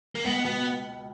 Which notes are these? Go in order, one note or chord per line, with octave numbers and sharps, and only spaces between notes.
A#3
C#2 B3
B2 B3